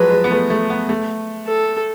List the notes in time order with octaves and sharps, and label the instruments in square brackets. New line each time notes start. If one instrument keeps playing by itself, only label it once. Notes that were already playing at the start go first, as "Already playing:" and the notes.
Already playing: [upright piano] F3 F#3 G#3 [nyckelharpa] B4
[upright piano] G#3
B3
A3
A3
B3
A3
[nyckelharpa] A4